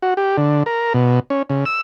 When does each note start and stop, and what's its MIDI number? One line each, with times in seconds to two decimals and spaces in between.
0.02 0.14 66
0.17 0.37 67
0.38 0.63 50
0.66 0.93 70
0.94 1.20 47
1.30 1.42 61
1.50 1.65 49
1.66 1.81 88